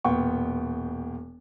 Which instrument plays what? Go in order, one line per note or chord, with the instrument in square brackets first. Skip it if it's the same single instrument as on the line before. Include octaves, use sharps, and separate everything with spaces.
[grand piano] E1 A#2 B3 G5 C#6